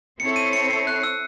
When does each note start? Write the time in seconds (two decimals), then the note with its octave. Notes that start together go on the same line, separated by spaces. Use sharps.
0.20 C4 E4 A4 C#5 C#7
0.36 D#7
0.53 C#7
0.70 C7
0.87 F#6
1.03 E6